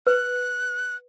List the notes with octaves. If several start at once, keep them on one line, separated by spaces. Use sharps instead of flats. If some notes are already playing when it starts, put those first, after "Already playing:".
B4 F#6